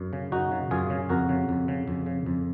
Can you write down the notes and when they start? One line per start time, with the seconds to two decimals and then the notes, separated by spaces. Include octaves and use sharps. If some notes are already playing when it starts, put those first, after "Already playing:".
Already playing: F#2
0.13 C#3
0.32 F#2 D#4 F#4
0.51 C#3
0.71 F#2 F4 G#4
0.90 C#3
1.09 F2 F#4 A#4
1.29 C#3
1.49 F2
1.68 C#3
1.88 F2
2.06 C#3
2.26 F2